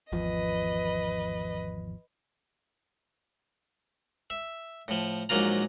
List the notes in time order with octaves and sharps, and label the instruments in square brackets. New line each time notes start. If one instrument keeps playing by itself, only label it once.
[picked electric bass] G#1 E2 F3 [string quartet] B4 D#5
[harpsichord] E5
A2 F3
A#1 G#2 F#3 A#3 F4 A#5